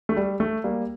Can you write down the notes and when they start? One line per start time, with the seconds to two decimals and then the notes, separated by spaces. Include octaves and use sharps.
0.09 A3
0.16 G3
0.40 A3
0.64 G3 A#3